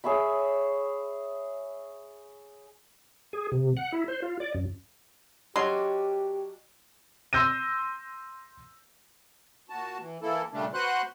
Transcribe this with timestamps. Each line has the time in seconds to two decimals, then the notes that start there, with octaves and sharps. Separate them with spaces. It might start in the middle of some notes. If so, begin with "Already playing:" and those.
0.04 G#4 C#5 E5 B5
3.33 G#4
3.52 C3
3.77 F#5
3.92 E4
4.08 C5
4.22 F4
4.40 D5
4.54 F#2
5.56 F#3 C#4 D4 G4 D#5 C6
7.33 C6 E6 G6 A#6 D#7
9.70 A#2 F#4 A5
10.00 E3
10.22 E3 A#3 E4 A4
10.53 A#2 C#3 G3 A3 D4
10.74 F#4 B4 C5 F#5 C6 F#6